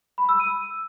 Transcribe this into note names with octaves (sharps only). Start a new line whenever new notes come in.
B5
E6
D#7